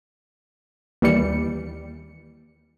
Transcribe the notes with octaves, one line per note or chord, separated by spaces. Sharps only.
D#2 E3 G3 C#7